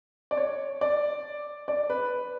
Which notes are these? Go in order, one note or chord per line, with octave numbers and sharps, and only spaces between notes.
D5
C#5
D5
D5
B4